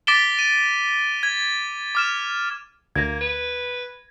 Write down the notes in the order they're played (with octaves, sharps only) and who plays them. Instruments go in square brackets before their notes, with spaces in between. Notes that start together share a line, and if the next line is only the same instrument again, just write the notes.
[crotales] D6 A6 B6 D7 E7 G7
D#7
G#6
D6 F6 E7
[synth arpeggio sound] D2 [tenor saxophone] A#3 [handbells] G#6 A#6
[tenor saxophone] B4